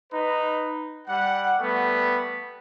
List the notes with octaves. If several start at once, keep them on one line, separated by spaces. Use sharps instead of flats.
D#4 B4
G3 F#5
G3 A3 B3